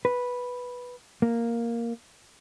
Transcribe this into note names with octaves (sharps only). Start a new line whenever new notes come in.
B4
A#3